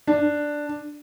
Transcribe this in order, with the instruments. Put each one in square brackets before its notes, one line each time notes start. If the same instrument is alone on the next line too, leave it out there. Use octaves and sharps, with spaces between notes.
[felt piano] D4